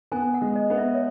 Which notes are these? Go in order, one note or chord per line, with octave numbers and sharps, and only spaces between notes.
B3 G#5
F#5
G#3
D#5
B3
E5
C#5